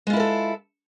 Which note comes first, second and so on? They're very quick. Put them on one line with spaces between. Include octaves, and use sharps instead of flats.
G#3 F4 E4 A#4 A4